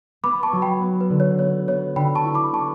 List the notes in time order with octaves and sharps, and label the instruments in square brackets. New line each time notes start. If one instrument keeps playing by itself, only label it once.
[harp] B3 [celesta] B5 D6
[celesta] A5 C#6
[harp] F#3
[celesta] G5 B5
[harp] B3
[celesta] B4
[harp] D3
[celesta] C#5
[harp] B3 [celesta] C#5
[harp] B3 [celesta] C#5
[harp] D3 [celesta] G5 B5
[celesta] A5 C#6
[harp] E4
[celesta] B5 D6
[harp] B3 [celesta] A5 C#6